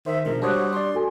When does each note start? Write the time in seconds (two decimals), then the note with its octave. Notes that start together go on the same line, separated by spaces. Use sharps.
0.06 D#3 C5 E5
0.26 B2 D3 F3 G#3 A#4
0.42 G3 D4 F#4 C5 C#5 A5 D#6 F#6
0.73 D4 D5 C6
0.94 F#4 A4 G#5